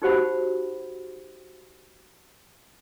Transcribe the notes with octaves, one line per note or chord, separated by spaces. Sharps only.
D#4 F#4 G4 C5 F#5 B5